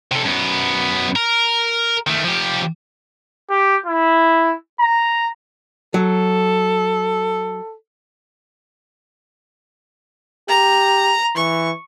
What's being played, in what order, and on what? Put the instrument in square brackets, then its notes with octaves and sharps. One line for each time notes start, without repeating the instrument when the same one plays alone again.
[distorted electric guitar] C3 A4
F#2 B3
A#4
D#3 A3
F3 G4
[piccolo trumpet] G4
E4
A#5
[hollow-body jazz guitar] F#3 [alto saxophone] A4
[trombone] G4 [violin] A#5
[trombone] E3 [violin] C#6